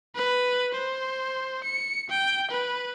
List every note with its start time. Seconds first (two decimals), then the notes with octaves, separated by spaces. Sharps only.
0.15 B4
0.74 C5
1.64 C#7
2.10 G5
2.51 B4